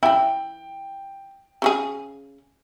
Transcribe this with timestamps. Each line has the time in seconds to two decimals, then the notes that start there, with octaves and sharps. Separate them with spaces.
0.03 E3 E4 G5
1.62 C#3 F#4 G#4